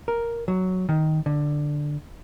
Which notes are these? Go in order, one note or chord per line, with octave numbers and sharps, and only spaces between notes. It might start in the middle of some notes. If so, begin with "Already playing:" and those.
A#4
F#3
D#3
D3